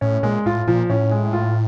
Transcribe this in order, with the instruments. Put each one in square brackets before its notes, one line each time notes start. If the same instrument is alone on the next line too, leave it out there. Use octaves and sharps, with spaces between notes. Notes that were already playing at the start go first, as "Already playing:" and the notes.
[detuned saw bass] A2 [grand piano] C#4
[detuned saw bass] A#2 [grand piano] G#3
[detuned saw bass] A2 [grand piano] F4
[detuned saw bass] A#2 [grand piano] F3
[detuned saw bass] A2 [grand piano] C#4
[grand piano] G#3
F4